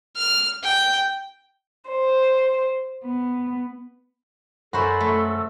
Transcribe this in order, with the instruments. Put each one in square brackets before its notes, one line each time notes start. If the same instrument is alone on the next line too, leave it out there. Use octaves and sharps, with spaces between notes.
[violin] F6
G5
[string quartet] C5
B3
[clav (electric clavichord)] F#2 [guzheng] F#4 C5 [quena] A4 [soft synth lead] B5
[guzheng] A3